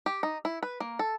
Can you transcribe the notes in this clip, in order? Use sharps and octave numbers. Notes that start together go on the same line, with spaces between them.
G4
D#4
E4
B4
A#3
A4